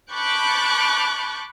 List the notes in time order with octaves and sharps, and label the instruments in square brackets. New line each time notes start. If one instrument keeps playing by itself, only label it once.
[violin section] A5 B5 C#6 D6 F#6 G6